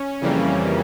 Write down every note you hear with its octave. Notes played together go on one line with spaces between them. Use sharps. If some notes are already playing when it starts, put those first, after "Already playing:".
Already playing: C#4
F2 C#3 E3 G3 A#3